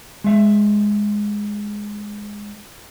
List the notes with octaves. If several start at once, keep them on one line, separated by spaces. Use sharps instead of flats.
G#3 E5